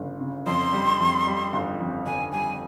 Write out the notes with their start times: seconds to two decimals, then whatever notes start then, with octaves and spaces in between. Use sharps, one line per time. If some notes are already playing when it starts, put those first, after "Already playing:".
Already playing: G1 C#3
0.21 C#3
0.47 F2 C6
0.73 G3
1.00 F2
1.27 G3
1.53 G1
1.80 F2
2.06 G1 G#5
2.32 G3 G#5